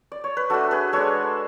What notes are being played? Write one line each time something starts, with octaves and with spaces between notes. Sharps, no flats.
D5
C#5
B4
A3 D4 F#4 A4
G#4 B4
G#3 D4 A4 C#5